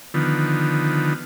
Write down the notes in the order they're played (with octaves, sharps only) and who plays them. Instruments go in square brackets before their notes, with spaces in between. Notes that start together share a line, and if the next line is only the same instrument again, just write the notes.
[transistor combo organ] D3 D#3 F3 B3